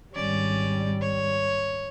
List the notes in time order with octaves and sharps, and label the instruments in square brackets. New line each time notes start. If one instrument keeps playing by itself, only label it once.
[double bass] G#1 G3 [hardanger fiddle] C#4 D5
[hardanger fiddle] C#5